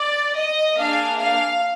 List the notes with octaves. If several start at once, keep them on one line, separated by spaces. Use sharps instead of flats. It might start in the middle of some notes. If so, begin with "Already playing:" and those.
Already playing: D5
D#5
A#3 D4 G#4 F5
F5